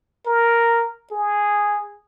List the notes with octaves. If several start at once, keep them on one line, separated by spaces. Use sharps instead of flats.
A#4
G#4